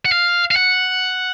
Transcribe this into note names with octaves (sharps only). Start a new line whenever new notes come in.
F#5
F5
F5
F#5